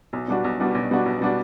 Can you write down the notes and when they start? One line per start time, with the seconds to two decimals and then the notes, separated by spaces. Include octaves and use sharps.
0.13 B1
0.28 B2 G3 D4 F#4
0.44 B1
0.60 B2 G3 D4 F#4
0.75 B1
0.91 B2 G3 D4 F#4
1.06 B1
1.21 B2 G3 D4 F#4